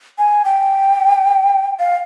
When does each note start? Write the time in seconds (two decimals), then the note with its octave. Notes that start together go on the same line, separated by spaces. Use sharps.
0.18 G#5
0.45 G5
1.79 F5